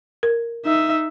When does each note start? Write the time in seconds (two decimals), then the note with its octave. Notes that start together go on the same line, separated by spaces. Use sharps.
0.23 A#4
0.65 D#4 E5